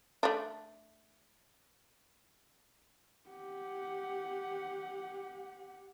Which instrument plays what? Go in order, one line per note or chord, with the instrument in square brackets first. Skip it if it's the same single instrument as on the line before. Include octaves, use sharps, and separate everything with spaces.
[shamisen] A3 D4
[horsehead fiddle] G4 F#5